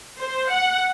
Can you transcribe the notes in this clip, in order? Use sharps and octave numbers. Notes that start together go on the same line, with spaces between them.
C5
F#5